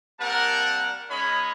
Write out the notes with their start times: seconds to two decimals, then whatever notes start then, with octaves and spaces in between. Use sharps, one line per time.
0.19 G3 A#3 C4 A#4 F#5 A5
1.09 G#3 C#4 D#4 C#5 D#5 B5